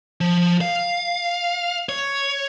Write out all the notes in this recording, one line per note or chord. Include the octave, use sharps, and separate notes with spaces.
F3
F5
C#5